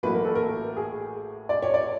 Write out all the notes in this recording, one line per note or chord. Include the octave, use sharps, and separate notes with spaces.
A1 A2 F#3 A#3 B4
A#4
A4
A#4
G#4
D5
C#5
D5